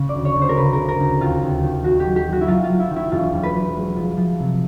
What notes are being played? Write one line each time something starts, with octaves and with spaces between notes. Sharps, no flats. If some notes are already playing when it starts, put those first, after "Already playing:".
Already playing: C#3
D5
D2
C#5
D2
C5
A#4
C#3 B4
A#4
C#3
A#4
D2
D#2 F4
D#2
D#3
D#3 F#4
G4
F#3
G4
D#3
F#4
E4
F#3 F4
F4
F#3
E4
D#3
E4
E1 F4
E1
B4
F#3
G#3
F3
F3
C3